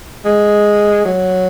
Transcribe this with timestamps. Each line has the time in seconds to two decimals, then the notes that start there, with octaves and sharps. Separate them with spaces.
0.25 G#3
1.05 F#3